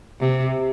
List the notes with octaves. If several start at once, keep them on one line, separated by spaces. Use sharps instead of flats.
C3